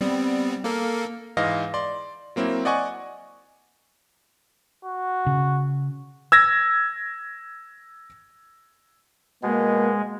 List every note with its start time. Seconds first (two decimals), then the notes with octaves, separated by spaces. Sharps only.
0.01 G3 B3 C4
0.64 A#3 A4 A#4
1.37 G#2 E3 D#5 F5 A#6
1.74 D5 C6
2.36 F#3 A#3 C4 E4
2.65 D5 D#5 F#5 G#5 C#6
4.85 F#4
5.26 C#3
6.32 E6 G#6 A#6
9.43 B2 G#3 A#3